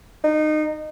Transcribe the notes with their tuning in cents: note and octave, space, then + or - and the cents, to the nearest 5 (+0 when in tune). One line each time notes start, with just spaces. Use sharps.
D#4 -25